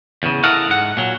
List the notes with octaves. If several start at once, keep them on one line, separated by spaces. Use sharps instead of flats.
E2 C#3
E4 A4 A#4 D#5 F5 F#5
G#2 F#5
A#2 F#3